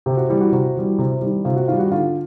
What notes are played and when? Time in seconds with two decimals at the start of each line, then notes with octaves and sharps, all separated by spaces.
0.06 C3 G4
0.17 F#4
0.29 E3 G3 G4
0.41 F#4
0.52 C3 F#4
0.76 E3 G3
0.99 C3
1.21 D#3 G3
1.45 C3 F4
1.56 F#4
1.68 D#3 G3 F4
1.79 F#4
1.92 D3 F4